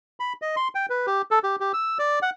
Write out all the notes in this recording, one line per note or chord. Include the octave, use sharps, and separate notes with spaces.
B5
D#5
C6
G5
B4
G4
A4
G4
G4
E6
D5
F#5